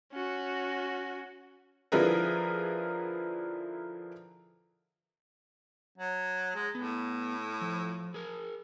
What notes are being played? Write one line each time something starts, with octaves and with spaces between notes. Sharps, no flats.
C#4 F#4
D3 F3 E4 G#4 A#4 B4
F#3
G#3
A2 B3
F3
G#4 A#4